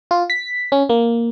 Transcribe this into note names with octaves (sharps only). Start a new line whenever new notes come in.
F4
B6
C#4
A#3